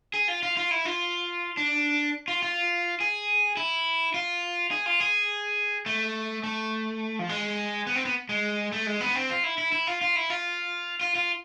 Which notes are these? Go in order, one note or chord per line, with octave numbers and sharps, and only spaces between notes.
G#4
F4
F4
F4
E4
F4
D4
F4
F4
G#4
E4
F4
G#4
F4
G#4
A3
A3
F3
G#3
B3
C4
B3
G#3
A3
G#3
B3
C4
F4
E4
E4
E4
F4
F4
E4
F4
F4
F4